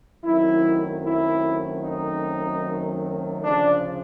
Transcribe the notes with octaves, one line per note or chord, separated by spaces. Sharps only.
F#2 D#3 F#3 A3 C4 E4
E4
D#4
D2 C#3 F3 D4